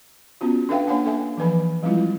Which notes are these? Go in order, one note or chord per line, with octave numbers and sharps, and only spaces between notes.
B3 C#4 F4 F#4
D4 A4 B4 E5 F5 G5
A#3 D4 C#5 F5 F#5 G#5
A4 E5 G#5
E3 F3 B4 G#5 B5
F3 G3 G#3 C4 E4 F4